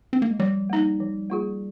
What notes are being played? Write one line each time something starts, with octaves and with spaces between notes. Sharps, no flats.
C4
A#3
G#3
F3 G3
A#3 D#4
F3
A#3 F4 G#4